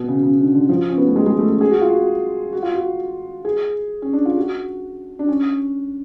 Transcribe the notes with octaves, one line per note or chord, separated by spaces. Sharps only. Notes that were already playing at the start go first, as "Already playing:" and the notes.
Already playing: B2
C#3
C#3
D3
D3
F3
C#4
B3
A3
G#3
G#3
A3
C#4
G#4
F#4
F4
F#4
F#4
F4
F#4
G#4
C#4
D4
F4
F#4
D4
C#4